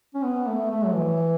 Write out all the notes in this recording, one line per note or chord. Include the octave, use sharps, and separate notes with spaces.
C#4
B3
A3
A3
F#3
E3